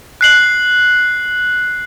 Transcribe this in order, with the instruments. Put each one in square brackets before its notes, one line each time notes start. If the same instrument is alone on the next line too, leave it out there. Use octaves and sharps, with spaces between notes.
[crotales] F#6 C7 F#7